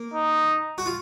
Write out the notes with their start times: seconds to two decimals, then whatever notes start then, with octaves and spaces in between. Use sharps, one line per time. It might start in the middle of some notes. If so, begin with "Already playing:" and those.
Already playing: A#3
0.14 D#4
0.78 F#4
0.86 F4